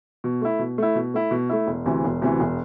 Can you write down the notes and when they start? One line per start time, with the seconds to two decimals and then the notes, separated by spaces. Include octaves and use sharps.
0.24 B2
0.42 A3 E4
0.59 B2
0.78 A3 E4
0.95 B2
1.14 A3 E4
1.31 B2
1.49 A3 E4
1.67 E1
1.86 D2 C3 E3
2.04 E1
2.22 D2 C3 E3
2.39 E1